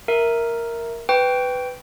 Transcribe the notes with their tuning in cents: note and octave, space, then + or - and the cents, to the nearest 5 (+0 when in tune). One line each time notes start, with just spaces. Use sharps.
A#4 +0 E5 +0
B4 +15 G5 +0 C#6 +25